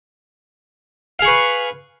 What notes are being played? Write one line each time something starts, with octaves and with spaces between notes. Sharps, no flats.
G#4 B4 F5 C#6